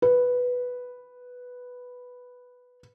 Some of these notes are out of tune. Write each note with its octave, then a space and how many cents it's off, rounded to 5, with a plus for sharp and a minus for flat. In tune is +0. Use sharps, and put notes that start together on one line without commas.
B4 +0